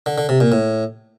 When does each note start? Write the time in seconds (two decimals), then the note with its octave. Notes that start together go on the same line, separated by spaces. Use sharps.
0.06 D3
0.18 D3
0.29 C3
0.40 A#2
0.52 A2